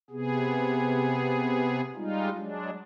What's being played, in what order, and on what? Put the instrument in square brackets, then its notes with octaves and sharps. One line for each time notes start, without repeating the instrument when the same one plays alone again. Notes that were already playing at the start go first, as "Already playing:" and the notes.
[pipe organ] C3 B3 G#4
G3 G#3 D#4 F4
F#3 G#3 D4